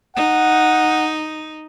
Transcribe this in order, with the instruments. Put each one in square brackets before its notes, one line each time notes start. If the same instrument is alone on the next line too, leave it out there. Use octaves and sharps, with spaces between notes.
[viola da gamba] D#4 [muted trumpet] F#5